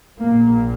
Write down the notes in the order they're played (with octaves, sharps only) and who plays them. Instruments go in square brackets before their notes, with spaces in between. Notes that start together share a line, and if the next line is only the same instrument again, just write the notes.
[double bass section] A#1 A#2 A#3